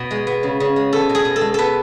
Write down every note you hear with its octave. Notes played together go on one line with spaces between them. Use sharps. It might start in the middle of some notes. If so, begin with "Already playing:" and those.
Already playing: B2 B3
G#3
B3
C#3
C#3
G#3
B3 A4
B2
G#4
B2
A4
G#3
B3 A4 B4